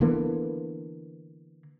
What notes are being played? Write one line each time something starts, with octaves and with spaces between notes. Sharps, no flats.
D3 E3 A#3 B3